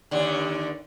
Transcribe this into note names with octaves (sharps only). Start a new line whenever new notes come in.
D#2 D3